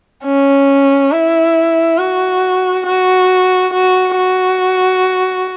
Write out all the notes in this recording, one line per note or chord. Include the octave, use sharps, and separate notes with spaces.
C#4
E4
F#4
F#4
F#4
F#4